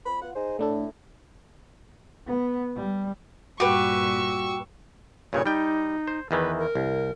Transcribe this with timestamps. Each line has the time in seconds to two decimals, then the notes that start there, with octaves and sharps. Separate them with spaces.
0.06 F2 B5
0.22 B3 F4 F#5
0.36 D#4 G#4 C5
0.59 A2 A3 D4 A4
2.27 B3
2.76 G3
3.60 G2 A#2 F#4 G4 B4 C#6 E6
5.33 G2 A#2 C#3 C#5
5.46 G3 D#4 G5
6.07 C5
6.31 E2 D#3 E3 B4
6.59 A#4
6.75 C2